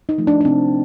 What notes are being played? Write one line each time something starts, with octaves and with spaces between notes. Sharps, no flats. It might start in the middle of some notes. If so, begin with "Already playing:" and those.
D#4
F3 A3
D4
D4
C3 C4